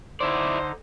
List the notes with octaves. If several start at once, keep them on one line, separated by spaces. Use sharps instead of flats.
D3 D#4 E4 C5 D5